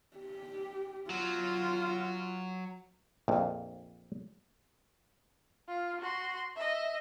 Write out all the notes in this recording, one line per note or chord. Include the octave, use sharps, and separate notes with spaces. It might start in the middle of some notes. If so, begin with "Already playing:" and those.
G4
F#3 F4
A#1 F2
F4
F#4 C6
D#5 E5